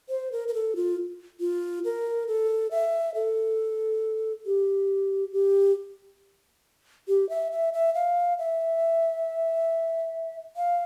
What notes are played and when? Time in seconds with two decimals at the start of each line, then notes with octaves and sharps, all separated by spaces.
0.09 C5
0.32 A#4
0.48 A#4
0.54 A4
0.76 F4
1.40 F4
1.85 A#4
2.28 A4
2.71 E5
3.15 A4
4.46 G4
5.33 G4
7.08 G4
7.29 E5
7.52 E5
7.73 E5
7.95 F5
8.39 E5
10.56 F5